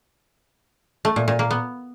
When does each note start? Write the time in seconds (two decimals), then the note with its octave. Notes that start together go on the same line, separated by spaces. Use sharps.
1.05 A3
1.16 A#2
1.28 A#2
1.39 A#3
1.51 B3